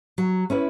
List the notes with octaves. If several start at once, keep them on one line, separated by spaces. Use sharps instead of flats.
F#3
C#4 E4 B4